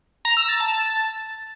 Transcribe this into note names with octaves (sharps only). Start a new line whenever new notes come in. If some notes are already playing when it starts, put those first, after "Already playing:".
A#5
E6
A6
A5